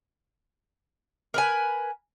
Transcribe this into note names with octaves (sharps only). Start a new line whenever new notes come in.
A#4 B4 G#5